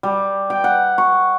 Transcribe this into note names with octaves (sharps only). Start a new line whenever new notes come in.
G3
G5
F#5
C#6